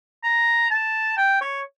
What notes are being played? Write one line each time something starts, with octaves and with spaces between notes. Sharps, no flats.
A#5
A5
G5
C#5